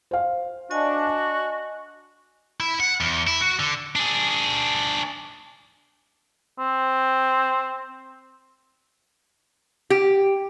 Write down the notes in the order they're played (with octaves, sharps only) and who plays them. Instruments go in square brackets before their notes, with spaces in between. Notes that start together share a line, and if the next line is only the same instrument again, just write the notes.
[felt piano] C5 F5
[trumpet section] D4 [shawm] F#4 [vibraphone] D#5 G#5
[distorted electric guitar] E4
F#5
E2
E4
F#4
D3
D4 G#4
[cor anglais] C4
[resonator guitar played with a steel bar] G4